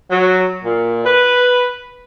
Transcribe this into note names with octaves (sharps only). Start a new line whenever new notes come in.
F#3
A#2
B4